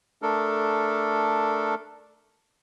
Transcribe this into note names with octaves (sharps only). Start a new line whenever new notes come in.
A3 D4 A4 A#4